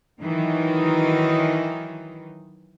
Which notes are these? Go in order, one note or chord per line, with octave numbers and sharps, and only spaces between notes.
D#3 E3 F#3 D#4